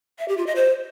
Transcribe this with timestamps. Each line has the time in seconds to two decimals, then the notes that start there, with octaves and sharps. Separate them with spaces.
0.19 E5
0.28 G4
0.37 F4
0.47 D#5
0.56 C5